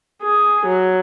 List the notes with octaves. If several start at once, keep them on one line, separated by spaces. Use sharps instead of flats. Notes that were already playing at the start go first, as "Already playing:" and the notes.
G#4
F#3